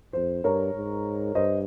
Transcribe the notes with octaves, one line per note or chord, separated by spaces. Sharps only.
F2 C5
G2 A#4 C#5
G#2
G2 C5 D#5